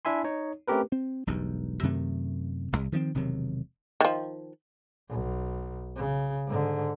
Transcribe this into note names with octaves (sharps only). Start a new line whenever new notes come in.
D4 E4 E5 G#5 C6
D#4 C#5
A3 C4 C#4 G4 A#4 B4
C4
E1 B1 G2
F#2 C3 D#3 A3
D1 C2
D#3 F3 G#3 C4
E1 C3 D#3 F#3
D#3 F3
B1
C#3
G#2 D3